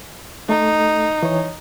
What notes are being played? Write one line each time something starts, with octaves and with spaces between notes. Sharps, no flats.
A3 D#4 A4
E3 C#5